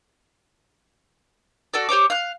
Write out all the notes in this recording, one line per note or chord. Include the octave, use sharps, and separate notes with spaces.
F#4 A4 D5
G4 C5 C#5 D6
F5 F#6